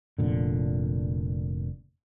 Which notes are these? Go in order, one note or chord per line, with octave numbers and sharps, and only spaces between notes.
F1 A#2 D3